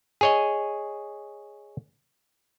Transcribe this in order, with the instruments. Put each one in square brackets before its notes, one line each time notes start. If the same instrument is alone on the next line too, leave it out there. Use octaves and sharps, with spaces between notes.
[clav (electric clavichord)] G#4 C#5 D#5